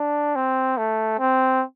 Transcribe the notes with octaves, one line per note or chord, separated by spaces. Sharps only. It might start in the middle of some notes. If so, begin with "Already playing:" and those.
Already playing: D4
C4
A3
C4